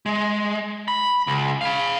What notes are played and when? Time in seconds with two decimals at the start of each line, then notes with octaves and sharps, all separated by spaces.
0.06 G#3
0.88 B5
1.27 C#2
1.61 F5 B5